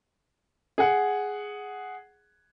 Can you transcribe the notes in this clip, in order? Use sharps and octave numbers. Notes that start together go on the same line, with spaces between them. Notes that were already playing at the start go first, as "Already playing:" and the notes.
G#4 F#5